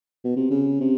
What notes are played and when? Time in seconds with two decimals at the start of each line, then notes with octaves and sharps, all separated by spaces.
0.24 B2
0.37 C3
0.51 C#3
0.80 C3